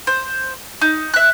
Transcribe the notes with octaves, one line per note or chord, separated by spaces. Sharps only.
C5
D#4
E5 F#6